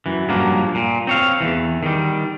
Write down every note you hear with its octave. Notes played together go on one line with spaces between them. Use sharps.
F#2 E3
G2 A#2 F3 F#3 A#3
A#2
C4 C#5 F5
E2 G#2 E3
D#3 G3